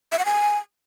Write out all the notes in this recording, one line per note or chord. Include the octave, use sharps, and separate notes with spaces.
E5
F#5
G#5